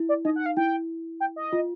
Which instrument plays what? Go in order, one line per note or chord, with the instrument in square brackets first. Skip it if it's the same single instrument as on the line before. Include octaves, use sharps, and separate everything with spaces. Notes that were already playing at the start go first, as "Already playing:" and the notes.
Already playing: [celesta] E4
[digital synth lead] D5
[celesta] D#4 [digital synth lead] D#5
[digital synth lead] F#5
F5
[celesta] E4 [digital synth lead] G5
[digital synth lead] G5
D#5
[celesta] F4